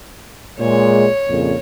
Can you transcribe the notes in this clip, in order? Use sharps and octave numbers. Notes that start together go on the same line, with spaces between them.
A#2 G#3 C#5
F2 A#2 C#3